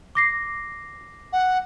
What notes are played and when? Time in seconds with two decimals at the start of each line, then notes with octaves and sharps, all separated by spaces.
0.15 D6 A#6 C7
1.32 F#5